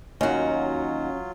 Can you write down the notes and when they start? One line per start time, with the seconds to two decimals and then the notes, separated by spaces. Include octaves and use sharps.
0.21 D#2 F#3 C#4 D#4 F4 F#4 F#5